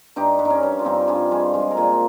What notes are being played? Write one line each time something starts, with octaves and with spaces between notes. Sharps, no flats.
G2 D#4 G4
G2
D#4
C#4
G2
F4
G2 C4 D#4
G4
G2 F4 G#4
G3 F4 G#4
G#3 F4 G#4
A#4
A#2 F4 G#4